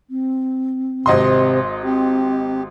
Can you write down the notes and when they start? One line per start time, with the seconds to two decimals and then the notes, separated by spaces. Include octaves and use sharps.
0.10 C4
1.06 G#1 C3 D#5 C6
1.83 C4 G4